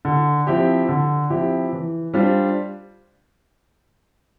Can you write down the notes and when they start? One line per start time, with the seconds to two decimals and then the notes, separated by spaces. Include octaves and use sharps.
0.05 D3
0.47 F3 C4 E4 G4
0.89 D3
1.30 F3 C4 E4 G4
1.73 E3
2.13 G3 D4 F4 C5